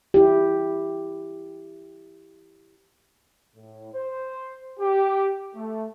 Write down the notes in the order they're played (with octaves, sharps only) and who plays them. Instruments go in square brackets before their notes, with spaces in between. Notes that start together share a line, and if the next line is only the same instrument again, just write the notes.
[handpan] E4 G4
[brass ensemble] A2
C5
G4
A3